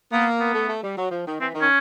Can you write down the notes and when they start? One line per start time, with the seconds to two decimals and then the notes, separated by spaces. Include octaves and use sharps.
0.13 A#3 B3
0.40 B3
0.55 A3
0.69 A3
0.84 G3
0.98 F#3
1.11 F3
1.26 D#3
1.40 E3 C4
1.55 D#3
1.61 C#4